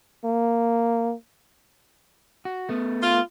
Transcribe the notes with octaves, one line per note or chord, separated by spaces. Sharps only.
A#3
F#4
A3 B3
F4